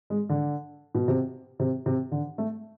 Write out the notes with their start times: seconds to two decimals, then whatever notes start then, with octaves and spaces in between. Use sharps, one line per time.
0.10 G#3
0.29 D3
0.95 B2
1.08 C3
1.59 C3
1.86 C3
2.12 D3
2.38 A3